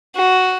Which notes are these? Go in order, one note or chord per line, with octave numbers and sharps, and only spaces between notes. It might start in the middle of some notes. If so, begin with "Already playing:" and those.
F#4